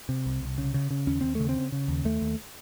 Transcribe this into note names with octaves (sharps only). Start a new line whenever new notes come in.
C3
C2
C2
C#3
C#3
C#3
D#2 C#4
D#2 C4
C#3 A3
C4
C#3
C#3
D#2
D#2 A3
D#2